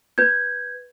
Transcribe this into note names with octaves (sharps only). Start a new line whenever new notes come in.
B4 G6 G#6